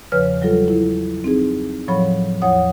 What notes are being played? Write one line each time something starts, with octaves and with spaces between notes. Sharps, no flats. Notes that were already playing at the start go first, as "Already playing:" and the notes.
E2 C#3 F3 B4 C#5 F6
F#3 G3 F4 A4
E4
C4 D#4 G#4
A2 F3 F#3 C#5 B5
E2 F3 C#5 F#5 D#6